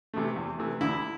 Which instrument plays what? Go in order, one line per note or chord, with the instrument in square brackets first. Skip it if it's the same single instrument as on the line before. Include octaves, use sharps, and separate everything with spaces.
[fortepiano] C3 E3 A3
E2
C3 E3 A3
D2 E4